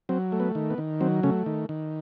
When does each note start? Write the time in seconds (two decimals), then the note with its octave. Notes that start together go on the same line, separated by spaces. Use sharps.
0.09 F#3 C4
0.32 A3
0.40 B3
0.55 D#3
0.70 B3
0.78 D#3
1.01 F#3 C4
1.23 C#3 A3 C#4
1.46 D#3
1.69 D#3